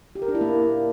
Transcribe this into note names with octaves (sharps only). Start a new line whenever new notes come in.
G4
A#4
D4
E4
A#3